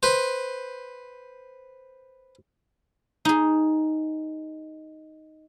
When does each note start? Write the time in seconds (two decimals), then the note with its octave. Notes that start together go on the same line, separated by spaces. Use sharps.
0.03 B4 C5
3.25 D#4 G#4